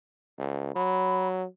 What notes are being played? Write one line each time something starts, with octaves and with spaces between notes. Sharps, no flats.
C#2
F#3 B5